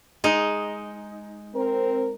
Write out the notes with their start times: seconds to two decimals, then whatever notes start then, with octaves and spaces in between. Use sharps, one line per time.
0.24 G#3 D#4
1.55 C4 A#4